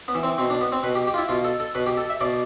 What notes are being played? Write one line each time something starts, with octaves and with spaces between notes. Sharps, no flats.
B3
E3
C4
B2 C4
D4
B3
C4
B2 B4
G4
G4
F4
E4
B2 F4
A4
A4
B2 B4
G4
A4
E5
B2 D5